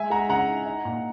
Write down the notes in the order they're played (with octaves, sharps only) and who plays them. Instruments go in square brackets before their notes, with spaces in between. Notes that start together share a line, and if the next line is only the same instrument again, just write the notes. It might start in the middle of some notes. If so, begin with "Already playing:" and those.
Already playing: [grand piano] G#3 E5 G#5
G#3 F#5 A#5
C#3 F#5 A#5
D#4
D#4
A#2